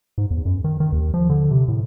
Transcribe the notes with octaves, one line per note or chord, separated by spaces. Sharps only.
G#2
E2
F#2
D#3
D#3
D#2
F3
D3
C3
A2